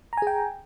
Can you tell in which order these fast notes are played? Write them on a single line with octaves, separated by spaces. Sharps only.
A#5 G#5 G#4 G5